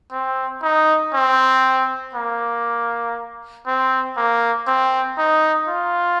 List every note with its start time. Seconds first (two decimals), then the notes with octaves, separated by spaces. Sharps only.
0.12 C4
0.63 D#4
1.13 C4
2.15 A#3
3.67 C4
4.17 A#3
4.67 C4
5.18 D#4
5.68 F4